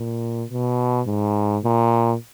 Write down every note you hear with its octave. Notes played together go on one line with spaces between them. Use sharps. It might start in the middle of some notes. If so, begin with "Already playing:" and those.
Already playing: A#2
B2
G#2
A#2